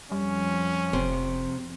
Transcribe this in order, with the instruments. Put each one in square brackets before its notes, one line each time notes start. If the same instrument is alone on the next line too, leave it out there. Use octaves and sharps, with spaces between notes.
[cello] F2 F3 [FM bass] G3 [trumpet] C#4
[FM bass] F1 [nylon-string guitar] C3